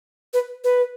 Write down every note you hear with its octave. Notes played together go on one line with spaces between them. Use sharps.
B4
B4